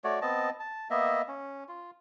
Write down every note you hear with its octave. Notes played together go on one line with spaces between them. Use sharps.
A3 F#4 C#5 D5
B3 C4 D#5 A5
A5
A#3 B3 D#5 E5
C#4
F4